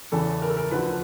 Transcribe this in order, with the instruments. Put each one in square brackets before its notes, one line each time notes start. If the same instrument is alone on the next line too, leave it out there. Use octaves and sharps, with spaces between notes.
[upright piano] E2 C#3 E3 A4
A#4
A4
A#4
D2 D3 F3 B4